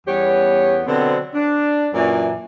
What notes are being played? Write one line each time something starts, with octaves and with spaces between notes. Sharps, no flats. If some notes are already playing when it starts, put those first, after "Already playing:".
E2 G3 B3 C#4 G4 C#5
B2 D3 F#3 B3 C4
D4
F#2 A#2 E3 F#3 A#4 D5